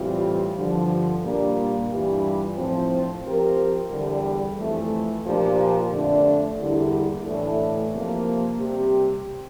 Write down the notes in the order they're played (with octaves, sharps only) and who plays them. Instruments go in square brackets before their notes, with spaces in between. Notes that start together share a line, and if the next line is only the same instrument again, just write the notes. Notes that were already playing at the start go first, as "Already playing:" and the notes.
Already playing: [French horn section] A2 E3 G3 C4 F4
G2 D3 F3
A#2 G3 A#3 D4
G2 E3 G3 D4 F4
A2 F3 C4
F3 C4 G4 A#4
E2 D3 G3
F2 E3 A3
A#2 F3 A#3 D4 G4
F2 D3 A3 D4
E2 D3 G3 A#3 E4
A2 E3 A3 D4 A4
C3 F3 A#3
C3 G3 C4 G4